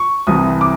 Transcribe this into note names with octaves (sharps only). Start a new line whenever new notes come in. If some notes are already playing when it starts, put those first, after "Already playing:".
Already playing: C#6
C2 C3 E3 D#6
D6